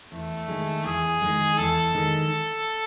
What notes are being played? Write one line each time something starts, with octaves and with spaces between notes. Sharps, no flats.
E2 A3
D#3 G#3
E2 G#4
D#3 G#3
E2 A4
D#3 G#3